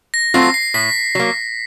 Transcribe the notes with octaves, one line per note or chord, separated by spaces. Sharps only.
A#6
F#3 A3 C4 F4 C7
C7
A2 B6
F#3 A#3